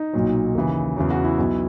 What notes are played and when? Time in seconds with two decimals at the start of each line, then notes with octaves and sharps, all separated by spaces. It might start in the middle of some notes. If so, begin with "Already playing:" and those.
Already playing: D#4
0.13 B1 A#2 F#3
0.55 D#2 C#3 E3
0.97 E2 C#3 F#3
1.10 F#4
1.24 E4
1.38 B1 B2 F#3